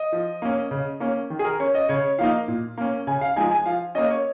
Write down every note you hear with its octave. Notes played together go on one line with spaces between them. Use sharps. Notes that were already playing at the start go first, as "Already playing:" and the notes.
Already playing: D#5
F3
A#3 C#4
C#3
A#3 C#4
D#3
G#4
A#4
C#4 C#5
D#5
C#3 C#5
F3 A#3 D#4 F5
A#2
A#3 C#4
C#3 G#5
F5
F3 G#3 D#4 G#5
G#5
F3 F5
A#3 C#4 D#5
C#5